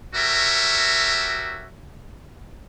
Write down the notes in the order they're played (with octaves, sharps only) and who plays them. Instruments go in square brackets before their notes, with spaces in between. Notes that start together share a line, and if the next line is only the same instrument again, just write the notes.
[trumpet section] F#4 G4 A4 A#4 C#5 E5